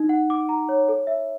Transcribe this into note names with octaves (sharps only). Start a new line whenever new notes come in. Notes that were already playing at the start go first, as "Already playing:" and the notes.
Already playing: D#4
F#5
D6
A#5
C#5
A4
E5